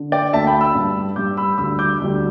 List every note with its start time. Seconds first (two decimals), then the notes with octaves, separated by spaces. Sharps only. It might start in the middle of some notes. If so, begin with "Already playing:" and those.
Already playing: D3
0.12 D5 G5
0.33 D2 D3 A3 E5 A5
0.47 G5 B5
0.61 B5 E6
0.75 G2 G3
1.16 G2 G3 D6 G6
1.37 B5 E6
1.58 D2 D3 G3 B5 E6
1.79 D6 G6
2.00 D2 D3 G3